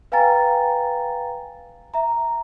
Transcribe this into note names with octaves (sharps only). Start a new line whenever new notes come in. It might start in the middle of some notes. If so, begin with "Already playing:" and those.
B4 F5 G5 G#5 A#5 A6
E5 A#5